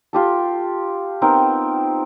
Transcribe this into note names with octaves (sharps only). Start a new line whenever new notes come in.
F4 G4 A4
B3 C4 D#4 A#4